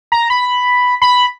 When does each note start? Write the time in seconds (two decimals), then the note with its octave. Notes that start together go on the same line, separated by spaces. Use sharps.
0.12 A#5
0.30 B5
1.02 B5